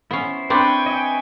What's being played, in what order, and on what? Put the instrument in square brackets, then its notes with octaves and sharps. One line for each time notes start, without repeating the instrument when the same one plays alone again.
[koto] B3 C#4 [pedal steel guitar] E4 C5
[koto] C4 D4 D5 [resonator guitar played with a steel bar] B4 [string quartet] G5 C#6 G#6
[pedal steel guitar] D#5 E5 G#5